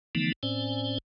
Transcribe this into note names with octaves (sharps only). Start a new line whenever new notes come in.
D3 E3 F3 A3 B3 D#4
A2 C4 C#4 C5 D5 G#5